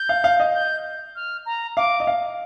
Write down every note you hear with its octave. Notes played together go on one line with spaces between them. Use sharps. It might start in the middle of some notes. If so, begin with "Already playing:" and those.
Already playing: G6
F5
F5
D#5
G6
F6
A#5
F5 D6
D#5
F5